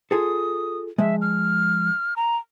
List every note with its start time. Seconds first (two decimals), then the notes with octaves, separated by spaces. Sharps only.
0.11 F4 G#4 A4 D#6
0.98 F3 G#3 E5
1.21 F6
2.16 A#5